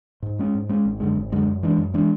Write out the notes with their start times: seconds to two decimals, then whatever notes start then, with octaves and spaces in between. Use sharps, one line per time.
0.22 G#2
0.39 G#3 C#4
0.55 G#2
0.69 G#3 C#4
0.86 G#1
1.00 F#2 D3 G#3
1.16 G#1
1.32 F#2 D3 G#3
1.48 F#2
1.63 E3 G#3 D4
1.78 F#2
1.94 E3 G#3 D4